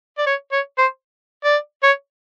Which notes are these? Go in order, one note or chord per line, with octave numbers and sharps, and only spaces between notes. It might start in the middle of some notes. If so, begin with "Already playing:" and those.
D5
C#5
C#5
C5
D5
C#5